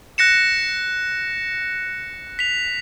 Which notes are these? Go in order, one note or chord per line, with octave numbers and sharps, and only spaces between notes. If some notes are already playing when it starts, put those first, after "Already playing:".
F#6 A#6 C#7 E7
B6 F7